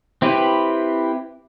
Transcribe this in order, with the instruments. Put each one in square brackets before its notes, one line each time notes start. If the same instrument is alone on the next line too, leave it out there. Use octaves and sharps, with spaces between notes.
[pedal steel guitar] C4 E4 G4 B4